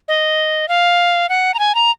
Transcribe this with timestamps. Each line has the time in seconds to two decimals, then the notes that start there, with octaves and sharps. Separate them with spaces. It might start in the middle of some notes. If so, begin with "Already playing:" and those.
0.08 D#5
0.68 F5
1.29 F#5
1.54 A#5
1.59 G#5
1.75 A#5